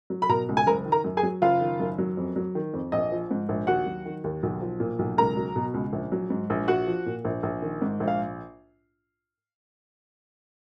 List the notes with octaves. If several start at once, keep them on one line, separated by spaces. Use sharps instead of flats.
F#3
B5
B2 A#4 A#5
C#2
G#5
F#1 A#4 A#5
D#3
A#4 A#5
F#2
G#4 G#5
F#3
F#1 F4 F5
D#3
F#2
F#3
F2
F#3
D#3
F2
A#1 D#5
F3
G#2
A#1
D#2 F#4 F#5
F#3
D#3
D#2
B1
F3
A#2
B1
C#2 A#4 A#5
F#3
B2
C#2
A#1
F#3
G#2
A#1
A#1 F#4 F#5
F3
A#2
A#1
A#1
D#3
G#2
A#1
F5